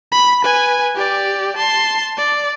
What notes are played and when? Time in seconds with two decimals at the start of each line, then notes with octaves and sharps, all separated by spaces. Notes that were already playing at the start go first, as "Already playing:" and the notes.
0.12 B5
0.44 B4 G#5
0.95 G4 D5
1.56 A5 C6
2.17 D5